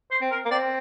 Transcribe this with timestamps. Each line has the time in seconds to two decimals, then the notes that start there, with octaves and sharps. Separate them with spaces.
0.11 C5
0.21 C4
0.31 A#4
0.45 A#3
0.51 C4 D5